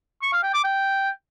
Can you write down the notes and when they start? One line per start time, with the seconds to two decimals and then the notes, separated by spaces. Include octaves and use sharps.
0.22 C#6
0.33 F5
0.43 G5
0.54 D6
0.64 G5